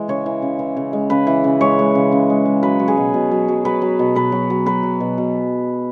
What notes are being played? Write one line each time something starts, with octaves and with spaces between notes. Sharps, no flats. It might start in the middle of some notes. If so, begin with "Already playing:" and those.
Already playing: E3 G#3
C#3 C#5
E3
C#3
E3
C#3
G#3
C#3 B4
E3
C#3
G#3 C#5
G#3
C#3
C#3
G#3
G#3
F#3 B4
F#3
G#4
B2
B2
F#3
F#3
F#3 B4
F#3
B2
B2 B4
F#3
F#3
F#3 B4
F#3
B2
B2